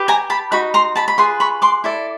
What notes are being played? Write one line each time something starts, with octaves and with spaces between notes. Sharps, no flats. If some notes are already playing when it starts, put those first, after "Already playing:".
Already playing: G4 B4
G#5 A#5
A5 B5
D#4 F#4 B5
A#5 C6
A5 B5
B5
F4 G#4 B4 C6
B5 C#6
C6 D6
E4 A4 D5